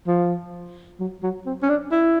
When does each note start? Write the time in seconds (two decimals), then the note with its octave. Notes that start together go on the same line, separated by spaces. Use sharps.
0.07 F3
1.00 F#3
1.23 F#3
1.46 C4
1.63 C#4
1.69 D4
1.92 E4